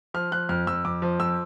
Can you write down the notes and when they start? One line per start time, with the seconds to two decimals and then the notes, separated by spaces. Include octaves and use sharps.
0.14 F3 F6
0.31 F3 F#6
0.49 F2 F6
0.67 F2 E6
0.85 F2 D6
1.02 F3
1.20 F2 E6